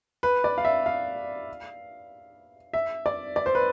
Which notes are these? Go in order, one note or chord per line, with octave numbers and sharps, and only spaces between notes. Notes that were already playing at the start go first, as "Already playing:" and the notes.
B4
D5
F5
E5
F5
E5
D5
D5
C5
B4